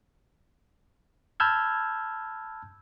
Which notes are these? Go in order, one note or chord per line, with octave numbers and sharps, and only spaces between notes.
A5 B5 E6 F6 G6 G#6